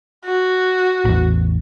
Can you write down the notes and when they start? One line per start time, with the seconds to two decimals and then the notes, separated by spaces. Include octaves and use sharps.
0.25 F#4
1.05 A1 E2